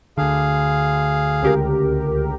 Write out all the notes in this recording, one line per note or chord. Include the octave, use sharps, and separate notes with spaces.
D2 D3 G#4 F5
C#2 G4 A#4